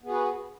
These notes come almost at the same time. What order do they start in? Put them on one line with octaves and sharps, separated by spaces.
B3 G#4 F#4 B4